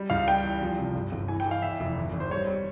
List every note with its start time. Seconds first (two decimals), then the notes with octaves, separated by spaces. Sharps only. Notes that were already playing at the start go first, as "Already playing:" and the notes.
Already playing: G3
0.10 C#2 F5
0.27 G3 G5
0.45 E2
0.62 F3
0.78 C3
0.95 G1
1.12 G1
1.28 E3 G#5
1.40 G5
1.46 E3
1.51 F5
1.62 E2 E5
1.80 F1
1.97 G#1
2.14 G#1
2.20 C5
2.30 G3 C#5
2.47 G3